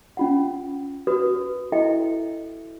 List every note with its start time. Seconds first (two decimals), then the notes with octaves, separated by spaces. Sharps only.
0.17 C#4 F4 F#5
1.07 F#4 B4 D#6
1.72 E4 A4 D#5 E5 G5